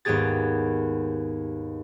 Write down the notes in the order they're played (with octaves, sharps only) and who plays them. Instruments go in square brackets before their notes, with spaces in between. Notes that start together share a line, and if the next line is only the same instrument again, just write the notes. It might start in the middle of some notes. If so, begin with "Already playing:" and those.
[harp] D#2 G#2 B3 G4 G#4 A6